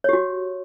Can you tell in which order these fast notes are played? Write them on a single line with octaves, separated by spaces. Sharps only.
C#5 G4 F#4